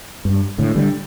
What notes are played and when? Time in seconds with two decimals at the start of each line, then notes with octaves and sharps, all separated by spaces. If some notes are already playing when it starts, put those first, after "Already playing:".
0.25 G2
0.58 A2 D3
0.75 D3 G3